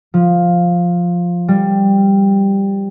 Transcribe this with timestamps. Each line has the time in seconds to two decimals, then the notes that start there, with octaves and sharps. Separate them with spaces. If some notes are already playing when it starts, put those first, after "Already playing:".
0.14 F3
1.48 G3